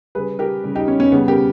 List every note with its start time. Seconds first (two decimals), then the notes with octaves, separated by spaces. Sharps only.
0.15 C#3 G3 G#4 B4
0.39 G4 A#4
0.64 C#3 G3
0.75 D#4 G4
0.88 C#4
1.00 C#4
1.12 C#3 G3 B3
1.28 G4 A#4